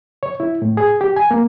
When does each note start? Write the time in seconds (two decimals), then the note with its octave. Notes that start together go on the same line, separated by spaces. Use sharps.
0.23 C#5
0.40 E4
0.62 A2
0.77 G#4
1.01 G4
1.16 G#5
1.31 A#3